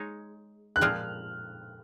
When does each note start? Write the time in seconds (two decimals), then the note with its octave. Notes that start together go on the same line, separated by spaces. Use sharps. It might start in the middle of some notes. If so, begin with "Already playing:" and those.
Already playing: G#3 D#4 C#5
0.76 F#6
0.81 A#2 F3 G#3 C4 F6